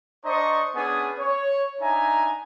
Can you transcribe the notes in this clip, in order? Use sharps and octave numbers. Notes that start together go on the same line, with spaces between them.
D4 C5 D5 D#5 A#5 C#6
B3 C#4 D4 G#4 G#5 D#6
C#5
D4 D#4 E5 G#5 A#5